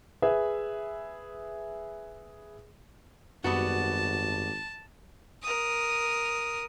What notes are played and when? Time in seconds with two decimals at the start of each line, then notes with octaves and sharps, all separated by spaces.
0.22 G#4 B4 E5
3.44 G#1 F#2 G3 B3 F#4 A5
5.42 A#4 D#6